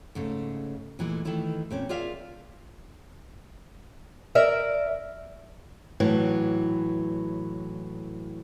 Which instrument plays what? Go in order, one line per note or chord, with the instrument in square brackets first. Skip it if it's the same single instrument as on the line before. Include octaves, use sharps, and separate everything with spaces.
[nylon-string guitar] G#2 C#3 A3
A#2 E3 G#3 A3
D#3 E3 A3 E4 F4
A#2 C4 C#4
F4 G#4 A#4 D5 E5 F5
[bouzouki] A#4 D5 E5
[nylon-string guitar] A2 E3 F#3